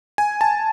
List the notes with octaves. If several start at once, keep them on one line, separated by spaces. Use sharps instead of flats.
G#5
A5